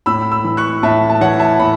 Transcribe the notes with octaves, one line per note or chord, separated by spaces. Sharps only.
A2 B5 E6
B5 E6
E3
C#6 F#6
A2 E5 A5
A5
E3 C#5 F#5
E5 A5
A2 F#5 B5